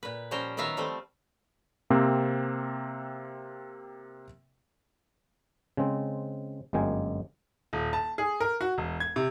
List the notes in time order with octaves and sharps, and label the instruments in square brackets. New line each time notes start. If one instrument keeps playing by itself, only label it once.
[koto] A#2 B4
F3 G3 C#4 C5 G5 A#5
D#3 F#3 B3 E5 F5 A#5
F3 G3 A3 C4
[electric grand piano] C3 A#3 C4
[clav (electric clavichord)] C#3 G#3 C4 C5
G1 F#2 G#3 A#3 G5 G#5
[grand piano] D#1
A5
G#4
A#4
F#4
E1
G#6
C3